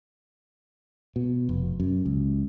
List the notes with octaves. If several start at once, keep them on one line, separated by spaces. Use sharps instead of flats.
B2
F1
F#2
C#2